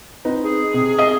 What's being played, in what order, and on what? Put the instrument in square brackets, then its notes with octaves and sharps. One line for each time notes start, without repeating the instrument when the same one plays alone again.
[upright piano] C4 D#4 B4
[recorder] G#4
[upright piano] C3
[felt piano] D#5